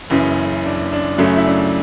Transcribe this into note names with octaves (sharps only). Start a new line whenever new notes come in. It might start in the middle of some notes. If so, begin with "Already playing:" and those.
F#1 F#2 C#3 E3 C#4
D4
D4
F#2 C#3 F#3 A3 C#4
E4
D4